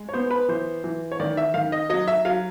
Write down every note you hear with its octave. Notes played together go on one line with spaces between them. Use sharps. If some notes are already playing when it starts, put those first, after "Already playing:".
Already playing: G#3
C#5
B3 C5
B4
E3 C5
E3
C#5
D#3 D5
E5
D#3 F5
D#5
F#3 D#5
E5
F#3 F5